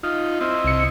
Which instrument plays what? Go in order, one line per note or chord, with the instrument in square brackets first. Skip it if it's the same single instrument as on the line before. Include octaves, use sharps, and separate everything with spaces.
[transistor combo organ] D#4 F4
C4 E4 D#5
[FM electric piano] C2 C#7